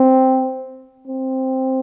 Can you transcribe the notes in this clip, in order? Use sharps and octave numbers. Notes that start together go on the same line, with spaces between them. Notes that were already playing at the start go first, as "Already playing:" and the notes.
Already playing: C4
C4